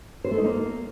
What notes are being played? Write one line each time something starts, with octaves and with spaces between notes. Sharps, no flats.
C5
A3
D#4
A#3